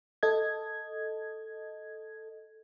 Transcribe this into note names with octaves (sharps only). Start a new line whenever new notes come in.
A4 D#5 G#6